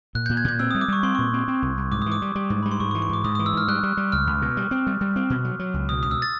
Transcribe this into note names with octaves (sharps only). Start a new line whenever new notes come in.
A#2 F#6
G6
A#2
G#6
A#2 G6
C4 E6
D#6
G3
D6
G3 C#6
C4 C6
C#6
A#2
C4
C4
C2
C2
G#2 D6
E3 D#6
D6
G3
G3
G#2
G3 B5
C6
G#2 C#6
C#6
E3
C#6
G#2 D6
G#2 D#6
D#6
E3
E6
G#2 F6
G3 F#6
G3
G3
C#2 F6
C#2
B2
G3
C4
G3
G3
C4
B2
F#3
F#3
C#2
B2 D#6
C#2 D#6
E6
A6